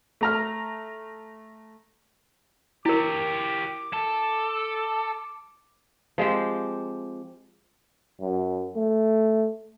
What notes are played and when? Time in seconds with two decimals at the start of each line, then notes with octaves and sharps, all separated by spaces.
0.21 A3 A#5 F6
2.86 E4 G4 A#4 C#5 D6
3.93 A4
6.18 F3 G#3 C4 G4
8.21 F#2
8.76 A3